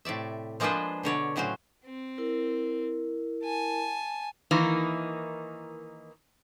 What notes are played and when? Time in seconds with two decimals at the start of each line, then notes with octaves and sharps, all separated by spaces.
0.05 A2 C3 D5 E5
0.60 F3 G#3 A#3 D4 B4 C5
1.03 B2 D3 C#5 D5
1.36 A2 C#3 F#3 F#4 C5
1.85 C4
2.18 E4 A#4
3.43 G#5 A5
4.51 D#3 E3 A#3 D#4